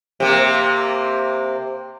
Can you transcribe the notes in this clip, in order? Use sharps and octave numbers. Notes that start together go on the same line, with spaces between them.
C3 A#3